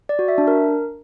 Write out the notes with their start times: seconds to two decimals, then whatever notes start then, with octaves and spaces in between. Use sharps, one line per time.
0.09 D5
0.19 F#4
0.28 E5
0.38 D4
0.47 A#4